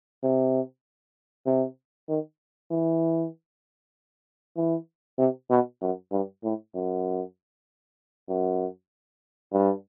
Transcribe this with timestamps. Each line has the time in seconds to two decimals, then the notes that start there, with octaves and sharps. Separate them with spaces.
0.23 C3
1.46 C3
2.09 D#3
2.71 E3
4.56 E3
5.18 C3
5.50 B2
5.82 F#2
6.11 G2
6.43 A2
6.74 F#2
8.29 F#2
9.53 G2